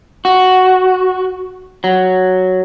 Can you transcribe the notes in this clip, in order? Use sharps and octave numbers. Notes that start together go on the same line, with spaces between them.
F#4
F#3